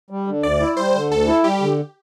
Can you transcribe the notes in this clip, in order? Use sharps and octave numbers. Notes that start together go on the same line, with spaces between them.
G3
D3
D2 D5
E4
G3 C5
D3
D2 A4
E4
G3 G4
D3